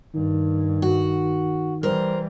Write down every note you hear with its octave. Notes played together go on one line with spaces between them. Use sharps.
G2 D#3
F#4
E3 G3 A#4 C5